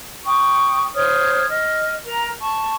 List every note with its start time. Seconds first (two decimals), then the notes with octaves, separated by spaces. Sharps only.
0.24 G5 C#6 D#6
0.94 C5 C#5 D#6 F6
1.48 D#5 F6
2.05 A#4 A#5
2.40 A5 C#6